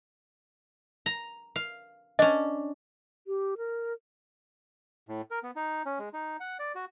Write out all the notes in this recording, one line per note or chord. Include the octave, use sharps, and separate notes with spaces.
A#5
F5
C#4 D4 D#5
G4
A#4
A2
A#4
B3
D#4
C#4
G#3
D#4
F#5
D5
F#4